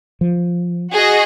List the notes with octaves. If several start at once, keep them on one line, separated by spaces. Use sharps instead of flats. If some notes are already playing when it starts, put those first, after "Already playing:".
F3
F#4 G#4 D#5